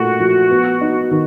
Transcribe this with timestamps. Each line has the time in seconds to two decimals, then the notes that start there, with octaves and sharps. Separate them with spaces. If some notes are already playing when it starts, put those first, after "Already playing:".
Already playing: A#2 A3 F#4
0.20 F3
0.51 B3
0.81 D#4
1.11 D#3